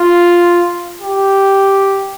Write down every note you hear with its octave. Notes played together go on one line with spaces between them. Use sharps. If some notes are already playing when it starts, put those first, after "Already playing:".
Already playing: F4
G4